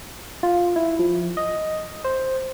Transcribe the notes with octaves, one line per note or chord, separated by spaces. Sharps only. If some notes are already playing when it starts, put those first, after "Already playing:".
F4
E4
F3
D#5
C5